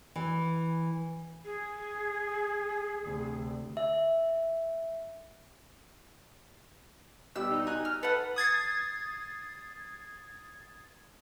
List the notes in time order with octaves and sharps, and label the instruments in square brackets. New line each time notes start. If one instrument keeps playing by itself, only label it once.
[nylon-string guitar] E3
[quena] G#4
[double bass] D2 C3
[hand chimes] E5
[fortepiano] B2 G3 G4 [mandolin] E6
[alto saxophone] D#4
[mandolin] G#5 [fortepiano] A#5 F#6
[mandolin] F6
[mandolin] A4 F#5 [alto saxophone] B4
[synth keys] D#6 G#6 A6 C7